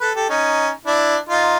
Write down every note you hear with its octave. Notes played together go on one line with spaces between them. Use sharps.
A4 B4
G4 A4
C#4 D#4
D4 E4
D#4 F4